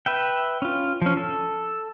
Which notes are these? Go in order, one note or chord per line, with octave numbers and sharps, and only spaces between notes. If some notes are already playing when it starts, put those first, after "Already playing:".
B4 E5 G5
C#4 F4
F3 C#4
A4